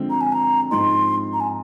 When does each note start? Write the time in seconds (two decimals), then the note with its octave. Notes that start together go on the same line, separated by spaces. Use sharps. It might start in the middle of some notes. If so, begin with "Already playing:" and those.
Already playing: D3 F3 G#3 C4
0.10 A#5
0.21 G#5
0.32 A#5
0.71 G#2 F3 G#3 C4 D#4 C6
1.33 A#5
1.40 G#5